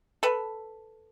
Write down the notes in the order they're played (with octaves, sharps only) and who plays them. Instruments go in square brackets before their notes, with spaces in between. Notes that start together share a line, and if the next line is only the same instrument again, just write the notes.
[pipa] A4 B4